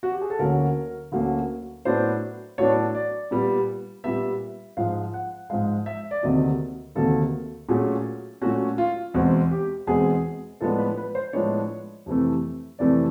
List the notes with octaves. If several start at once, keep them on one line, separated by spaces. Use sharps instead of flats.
F#4
G4
G#4
A4
D2 D3 F#3 A#3 C#4 A#4
D2 D3 F#3 A#3 C#4
A2 F#3 B3 D4 C5
A2 F#3 B3 D4 C#5
D5
A#2 G3 B3
A#2 G3 B3 E5
G#2 F3 G#3 F5
F#5
G#2 F3 G#3 F5
E5
D5
D2 C3 D#3 F#3 A#3 D#5
D2 C3 D#3 F#3 A#3 A4
A#2 F#3 A3 C#4 G#4
A#2 F#3 A3 C#4 F#4
F4
E2 B2 G#3 C4 F#4
G4
E2 B2 G#3 C4 G#4
A2 F3 G#3 B3 D4 A4
B4
B4
C5
A2 F3 G#3 B3 D4 C#5
F2 C3 E3 A3
F2 C3 E3 A3 D5